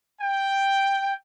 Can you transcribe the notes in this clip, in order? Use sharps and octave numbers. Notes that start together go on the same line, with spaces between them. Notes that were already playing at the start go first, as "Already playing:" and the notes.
G5